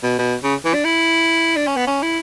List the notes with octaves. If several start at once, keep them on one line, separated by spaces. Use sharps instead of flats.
B2
B2
C#3
E3
D4
E4
D4
C#4
B3
C#4
E4